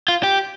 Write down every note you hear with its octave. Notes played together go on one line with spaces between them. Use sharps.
F4
G4